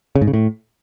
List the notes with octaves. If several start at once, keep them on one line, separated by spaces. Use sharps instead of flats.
C#3
G#2
C#3
A2